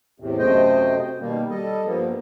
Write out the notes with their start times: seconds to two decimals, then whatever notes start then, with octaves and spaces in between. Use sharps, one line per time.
0.20 E2 A2 C3
0.39 F#2 C3 A3 C5 D#5 G5
1.20 B2 D#3 G3 A#3
1.50 G3 A4 D#5
1.85 G2 F3 A#3 B3